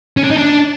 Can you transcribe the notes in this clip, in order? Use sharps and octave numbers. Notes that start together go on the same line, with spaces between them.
C#4
D4
D#4
D4